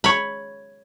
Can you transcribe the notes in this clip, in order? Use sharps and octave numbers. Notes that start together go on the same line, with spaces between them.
C#5 B5